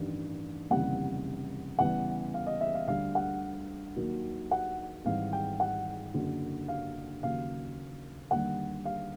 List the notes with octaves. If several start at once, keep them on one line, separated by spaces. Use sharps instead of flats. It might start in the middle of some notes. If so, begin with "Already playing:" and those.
Already playing: A1 G2 D#3
F1 D#2 C#3 E3 G3 F#5
E2 C#3 E3 G3 F#5
F5
D#5
E5
F5
D2 D3 G3 F5
F#5
D#2 D#3 F#3
F#5
G#1 G#2 E3 G3 F5
G5
F#5
F#1 F#2 D3 F#3
F5
D#2 C#3 F#3 F5
D#2 D3 G3 F#5
F5